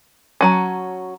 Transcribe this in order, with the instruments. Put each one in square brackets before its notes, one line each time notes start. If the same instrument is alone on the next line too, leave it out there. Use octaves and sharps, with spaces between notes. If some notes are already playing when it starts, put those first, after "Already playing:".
[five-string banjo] F#3 C#4 [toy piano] A5 A#5